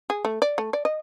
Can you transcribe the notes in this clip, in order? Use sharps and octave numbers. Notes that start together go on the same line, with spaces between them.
G#4
A3
D5
A3
D5
D#5